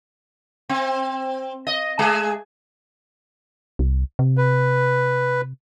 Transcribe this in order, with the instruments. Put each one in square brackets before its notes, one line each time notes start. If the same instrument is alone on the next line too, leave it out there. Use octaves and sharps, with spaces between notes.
[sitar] C4
D#5
G#3 G#4
[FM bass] C2
C3
[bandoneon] B4